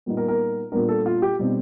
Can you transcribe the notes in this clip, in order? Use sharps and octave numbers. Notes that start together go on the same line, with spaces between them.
A#2 G3 B3 D#4
A#4
A#4
A#2 G3 B3 D4 A#4
A4
F4
G4
B2 G3 C4 D#4